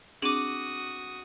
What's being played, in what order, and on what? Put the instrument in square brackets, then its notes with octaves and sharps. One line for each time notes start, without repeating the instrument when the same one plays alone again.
[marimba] C4 D4 G#4 [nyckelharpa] F#4 D#6 [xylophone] D6 D#7 F#7